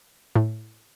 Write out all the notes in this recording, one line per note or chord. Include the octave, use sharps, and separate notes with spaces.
A2